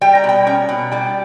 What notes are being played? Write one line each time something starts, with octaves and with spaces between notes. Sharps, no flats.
G3 G5
A#5
B2 G5
C#4 A#5
B2
G3 G5